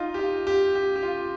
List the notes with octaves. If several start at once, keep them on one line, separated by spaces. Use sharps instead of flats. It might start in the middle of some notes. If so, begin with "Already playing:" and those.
Already playing: D#4 F4
G4
F4
G4
G4
G4
F4